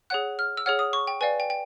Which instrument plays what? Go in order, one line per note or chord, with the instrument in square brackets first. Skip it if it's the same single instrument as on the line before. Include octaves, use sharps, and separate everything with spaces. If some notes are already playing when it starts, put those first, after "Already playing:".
[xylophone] G#4 C#5 F#5 F#6
F6
E6
G#4 C#5 F#5 F6
D#6
C#6
G5
B4 D5 F5 G#5
G5
G5